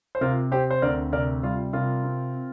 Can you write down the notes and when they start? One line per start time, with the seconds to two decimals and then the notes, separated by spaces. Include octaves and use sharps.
0.15 C5
0.21 C3 F4 A#4
0.52 C4 G4 C5
0.70 C5
0.82 D2 A#4 D5
1.13 C3 A#4 D5
1.43 G3 F4
1.73 C3 F4 A#4
2.04 C4